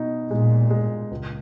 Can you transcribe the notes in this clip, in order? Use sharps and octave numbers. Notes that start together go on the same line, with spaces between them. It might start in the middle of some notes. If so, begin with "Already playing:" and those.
Already playing: B2 D#4
A#2 G#3
G#3
C#2